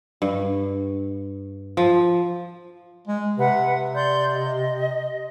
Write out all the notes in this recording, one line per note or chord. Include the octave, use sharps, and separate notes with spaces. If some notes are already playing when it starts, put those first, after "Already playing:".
G2
F3
G#3
C3 B4 F#5
D5 C6 G6
D#5